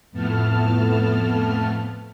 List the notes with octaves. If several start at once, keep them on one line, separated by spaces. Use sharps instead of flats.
F2 A2 A3 B3 A5 F6